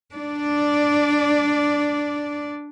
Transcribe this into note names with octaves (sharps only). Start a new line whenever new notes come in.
D4 D5